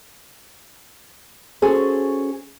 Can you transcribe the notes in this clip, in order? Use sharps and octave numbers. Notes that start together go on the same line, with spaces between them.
C#4 F#4 G#4 A4 C5